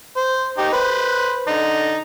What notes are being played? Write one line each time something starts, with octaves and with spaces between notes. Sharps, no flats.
C5
D#4 G4
B4 C5
D3 D#4